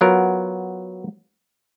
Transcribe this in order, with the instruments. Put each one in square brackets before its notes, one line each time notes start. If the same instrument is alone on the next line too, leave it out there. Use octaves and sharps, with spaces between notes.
[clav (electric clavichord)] F#3 B3 F4 A#4